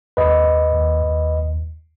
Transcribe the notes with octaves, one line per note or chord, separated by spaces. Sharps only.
D#2 B4 D#5
D#2
D#2
D#2